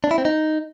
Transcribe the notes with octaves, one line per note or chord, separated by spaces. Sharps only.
D4
E4
C4
D#4